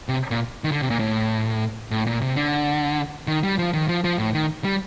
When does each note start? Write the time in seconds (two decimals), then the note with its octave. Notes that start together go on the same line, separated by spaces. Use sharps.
0.09 C3
0.31 A#2
0.64 D#3
0.72 D3
0.81 C3
0.90 A#2
0.99 A2
1.91 A2
2.07 A#2
2.22 C3
2.36 D3
3.27 D#3
3.44 G3
3.58 F3
3.73 D#3
3.88 F3
4.04 F3
4.18 A2
4.34 D#3
4.64 G3